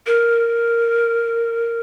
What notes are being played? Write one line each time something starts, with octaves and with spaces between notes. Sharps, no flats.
A#4